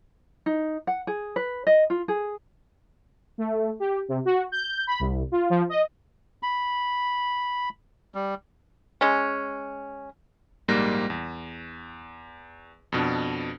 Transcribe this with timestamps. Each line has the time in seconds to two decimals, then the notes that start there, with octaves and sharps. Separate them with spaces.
0.46 D#4
0.87 F#5
1.07 G#4
1.36 B4
1.67 D#5
1.90 F4
2.08 G#4
3.38 A3
3.80 G4
4.08 C3
4.25 F#4
4.52 G6
4.87 B5
5.00 C2
5.32 F4
5.50 F3
5.69 D#5
6.43 B5
8.14 G3
9.01 G#3 C#4
10.68 A#1 G#2 G3 A#3 F#6 A#6
11.10 E2
12.92 F2 B2 D4